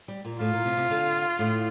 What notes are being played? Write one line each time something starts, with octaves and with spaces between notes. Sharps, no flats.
G3
A#2
A2 F4
A#2
C3
C3
D3
A2